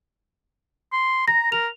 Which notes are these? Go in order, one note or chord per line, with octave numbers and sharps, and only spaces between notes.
C6
A#5 A#6
A#4 F7